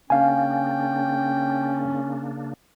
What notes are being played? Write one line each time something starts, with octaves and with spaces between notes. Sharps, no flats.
C#3 A#3 C#4 D4 F5 G5 G#5